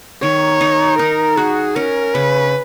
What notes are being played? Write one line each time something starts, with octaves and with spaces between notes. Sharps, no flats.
D#3 C#5
D#4
D#4 A#4
F#4 G#4
C#4 A#4
C#3 B4